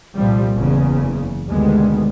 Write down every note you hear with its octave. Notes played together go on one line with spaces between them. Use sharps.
C2 A#2 F3 G3
F#1 E2 C#3
D2 B2 D#3 G3 G#3 B3